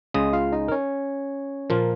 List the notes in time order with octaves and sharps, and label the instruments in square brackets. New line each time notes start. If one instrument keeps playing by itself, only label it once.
[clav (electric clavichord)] C#2 C#3 G#3 [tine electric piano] D#5 D#6
[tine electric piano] F4 F5
D#4 D#5
A#4
C#4 C#5
[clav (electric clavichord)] A#2 F3 A#3 F4 [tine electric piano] A#4